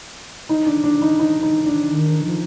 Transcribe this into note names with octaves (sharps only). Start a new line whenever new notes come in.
D#4
D4
D4
D#4
D#4
D#4
D4
D#3
F3